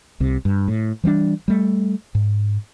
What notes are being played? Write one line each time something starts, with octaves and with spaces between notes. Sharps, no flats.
C2 C3
G2
A2
E3 G3 G#3 D4
G3 A3
G#2